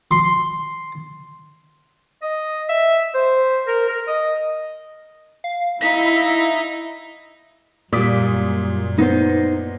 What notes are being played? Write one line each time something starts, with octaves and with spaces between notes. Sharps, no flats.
C6
D#5
E5
C5
A#4
A#4
D#5
F5
D#4 E4 B6
F#2 A#2 G3 D5 D#6 B6
B3 D#4 C5